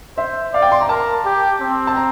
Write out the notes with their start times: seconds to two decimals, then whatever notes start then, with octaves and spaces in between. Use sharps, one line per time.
0.18 C5 E5
0.54 D5 F5
0.62 G5
0.72 C6
0.81 A#5
0.89 A#4 A5
1.25 G4
1.61 C4
1.87 A5
1.96 A#5